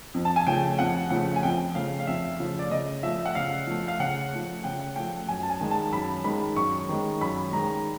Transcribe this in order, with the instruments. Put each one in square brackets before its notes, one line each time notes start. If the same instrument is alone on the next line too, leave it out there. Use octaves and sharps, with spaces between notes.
[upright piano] F2
[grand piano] A5
G#5
[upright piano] C#3 F3 A3 [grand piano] G5
[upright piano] F2 [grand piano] F#5
[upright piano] C#3 F3 A3 [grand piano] F#5
[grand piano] G#5
[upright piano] F2 [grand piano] G5
[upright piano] C#3 F3 A3 [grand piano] F5
[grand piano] F5
[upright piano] F2 [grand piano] E5
[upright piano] C#3 F3 A3
[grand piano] D5
[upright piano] C#3 [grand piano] D#5
[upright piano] F3 A3 [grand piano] E5
[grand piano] F#5
[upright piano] C#3 [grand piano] F5
[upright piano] F3 A3
[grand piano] F5
[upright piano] C#3 [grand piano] F#5
[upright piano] F3 A3
[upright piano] C#3 [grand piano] G5
[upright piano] F3 A3 [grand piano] G5
[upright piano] F#2 [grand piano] G#5
[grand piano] A5
G#5
[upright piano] D#3 G#3
[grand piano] A5
[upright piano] F#2 [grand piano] B5
[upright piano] D#3 G#3 [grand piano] B5
[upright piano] F#2 [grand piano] C#6
[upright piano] D#3 G#3
[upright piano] F#2 [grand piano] B5
[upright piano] D#3 G#3 [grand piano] A#5